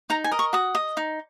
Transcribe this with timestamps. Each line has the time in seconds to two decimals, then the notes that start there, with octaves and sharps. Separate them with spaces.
0.10 D#4 A#5
0.24 G#5
0.32 A#4 D#5
0.39 C#6
0.53 F#4 D#6
0.75 D#5
0.97 D#4